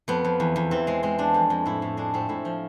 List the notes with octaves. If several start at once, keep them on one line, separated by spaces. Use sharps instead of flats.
F2 B3
F2
E2
E2
E3 C4
G#3 C4
G#3 C4
G#3 D4
F2
F2
A2 E4
A2
G#3 D4
A2 C4
A2 E4
F3